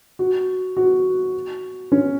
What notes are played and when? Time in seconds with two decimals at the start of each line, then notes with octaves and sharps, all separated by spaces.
0.19 F#4
0.77 F#4
1.92 C#4